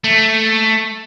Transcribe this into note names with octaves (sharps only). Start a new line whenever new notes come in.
A3